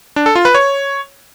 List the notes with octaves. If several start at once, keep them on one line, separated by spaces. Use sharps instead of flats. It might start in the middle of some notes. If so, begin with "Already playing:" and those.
D4
A4
F4
B4
C#5